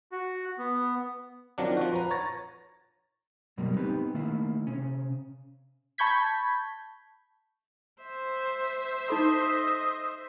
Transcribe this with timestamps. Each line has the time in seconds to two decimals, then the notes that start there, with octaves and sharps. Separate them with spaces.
0.12 F#4
0.58 B3
1.58 D#3 F#3 C4 D4 F4
1.77 F3 F#4
1.92 B4 A#5
2.11 C#5 A#5 A6 A#6
3.58 F#2 B2 F#3 G3 A#3
3.77 B3 C4 D#4 G4 B4
4.14 D#3 A3 A#3 E4
4.67 C3 C#4
5.98 A5 B5 C#6 G6 G#6 B6
8.02 C5 E5
9.08 D#4 A4 D#5 B5